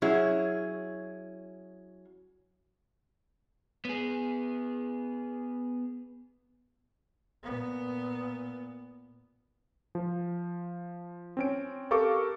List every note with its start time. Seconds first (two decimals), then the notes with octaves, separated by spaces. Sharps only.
0.02 F#3 C#4 E4 G#4
3.85 B3 G#4
7.43 A#2 B3
9.95 F3
11.37 C4 C#4 D7
11.91 G4 A4 A#4 F5 C#6 D6